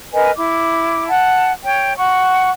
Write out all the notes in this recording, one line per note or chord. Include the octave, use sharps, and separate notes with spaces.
A#4 B4 D#5 G#5
E4 D6
F#5 A5
C#5 G5
F#5 C#6